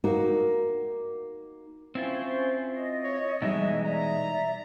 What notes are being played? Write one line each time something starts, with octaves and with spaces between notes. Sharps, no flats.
A#3 D#4 F#4 A#4
C4 C#4 E4 F4 C5
D#5
C#5
B2 E3 G3 G#3 D#4 E5
D5 E5 A#5